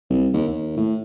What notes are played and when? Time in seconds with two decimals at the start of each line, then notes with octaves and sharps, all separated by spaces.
0.10 C2
0.33 D#2
0.48 D#2
0.77 A2